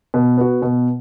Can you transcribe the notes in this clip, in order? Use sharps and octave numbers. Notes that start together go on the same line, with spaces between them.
B2
B3 F#4
B2